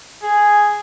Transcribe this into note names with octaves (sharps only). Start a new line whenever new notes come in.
G#4